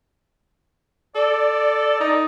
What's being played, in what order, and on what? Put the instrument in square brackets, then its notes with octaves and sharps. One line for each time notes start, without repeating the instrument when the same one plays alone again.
[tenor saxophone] A4 [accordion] D5
[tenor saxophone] D#4